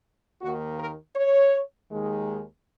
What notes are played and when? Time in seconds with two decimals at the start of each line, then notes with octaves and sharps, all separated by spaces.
0.42 D#2 D#3 A#3 F#4
0.79 A#4
1.16 C#5
1.91 D#2 D#3 G#3